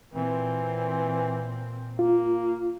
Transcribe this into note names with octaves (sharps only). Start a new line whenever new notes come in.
A#2 E3 C4
A#3 F4